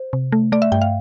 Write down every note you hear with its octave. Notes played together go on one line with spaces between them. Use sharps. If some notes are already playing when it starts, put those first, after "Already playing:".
Already playing: C5
C3
A3
A3 D5
E5
G2 G5
F5